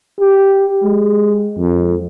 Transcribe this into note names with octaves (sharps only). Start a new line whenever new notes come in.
G4
G#3
F2